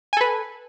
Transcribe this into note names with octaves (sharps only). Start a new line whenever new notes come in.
A4 B4 G#5